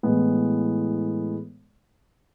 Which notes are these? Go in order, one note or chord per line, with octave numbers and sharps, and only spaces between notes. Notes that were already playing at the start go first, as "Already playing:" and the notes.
A2 E3 G#3 B3